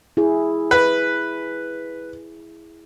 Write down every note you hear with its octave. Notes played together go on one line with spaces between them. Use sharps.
E4 G#4
B4